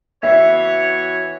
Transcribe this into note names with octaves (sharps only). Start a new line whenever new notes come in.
E3 B3 F#4 C#5 E5